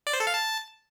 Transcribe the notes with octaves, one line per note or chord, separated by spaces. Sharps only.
D5
C5
A4
F5
A5